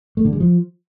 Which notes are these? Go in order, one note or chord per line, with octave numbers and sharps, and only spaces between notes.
A3
D3
G#3
F3